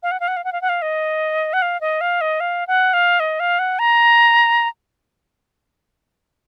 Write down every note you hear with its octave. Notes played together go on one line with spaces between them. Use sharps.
F5
F#5
F5
F#5
F5
F#5
F5
F#5
F5
D#5
F#5
F5
D#5
F5
D#5
F5
F#5
F5
D#5
F5
F#5
A#5